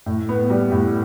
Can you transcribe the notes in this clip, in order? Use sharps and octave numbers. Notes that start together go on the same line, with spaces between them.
A2
B3
G3
A2